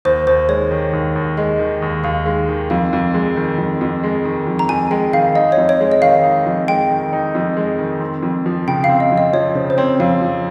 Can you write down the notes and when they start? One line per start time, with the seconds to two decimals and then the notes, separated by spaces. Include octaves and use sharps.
0.05 D#2 C5
0.27 D#2 C5
0.48 G#3 C#5
0.71 D#3
0.93 D#2
1.16 D#2
1.37 G#3 D#5
1.59 D#3
1.82 D#2
2.04 D#2 F5
2.26 G#3
2.49 D#3
2.70 F2 F5
2.93 F2
3.14 G#3
3.36 D#3
3.58 F2
3.81 F2
4.03 G#3
4.25 D#3
4.47 F2
4.59 A#5
4.69 F2 G#5
4.91 G#3 G5
5.13 D#3 F5
5.35 D#4 D#5
5.52 C#5
5.57 F2
5.69 C#5
5.80 G#3
5.92 D#5
6.01 D#3 F5
6.24 D#4
6.46 F2
6.68 G#3 G5
6.90 D#3
7.13 D#4
7.35 F2
7.57 G#3
7.79 D#3
8.00 C4
8.22 F2
8.46 F3
8.68 C#3 G5
8.84 F5
8.89 C4
9.00 D#5
9.12 F2
9.18 D#5
9.33 F3 C#5
9.55 C#3 C5
9.70 C5
9.78 C4 C#5
10.00 F2 F5
10.22 F3